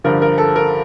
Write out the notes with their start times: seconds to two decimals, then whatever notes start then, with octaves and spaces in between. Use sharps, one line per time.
0.04 G2 D3 F3 A#4
0.22 A#4
0.38 A4
0.56 A#4